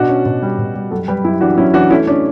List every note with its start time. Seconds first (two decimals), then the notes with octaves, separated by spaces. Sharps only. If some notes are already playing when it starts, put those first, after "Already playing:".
Already playing: B2 D4 F#4
0.09 C#4
0.26 B2
0.42 G3
0.59 B2
0.75 G3
0.91 F#2 F#4 A4
1.08 G3 G4 B4
1.24 F#2 E4 G4
1.41 E3 D4 F#4
1.57 F#2 C#4 E4
1.74 E3 D4 F#4
1.90 A3 C#4 E4
2.07 C#4 D4